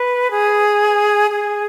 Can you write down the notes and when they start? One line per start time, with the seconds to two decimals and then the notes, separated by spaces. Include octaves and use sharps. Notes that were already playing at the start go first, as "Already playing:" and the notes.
Already playing: B4
0.31 G#4
1.31 G#4